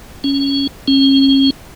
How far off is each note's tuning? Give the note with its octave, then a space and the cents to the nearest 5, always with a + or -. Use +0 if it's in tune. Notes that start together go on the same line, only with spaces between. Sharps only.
C#4 +0
C#4 -35